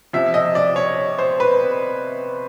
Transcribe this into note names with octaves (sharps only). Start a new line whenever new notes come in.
C3 F3 E5
D#5
D5
C#5
C5
B4